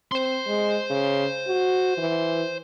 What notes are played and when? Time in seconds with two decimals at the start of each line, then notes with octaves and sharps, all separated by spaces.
0.12 C4 C5 C6
0.47 G#3
0.90 C#3
1.47 F#4
1.98 E3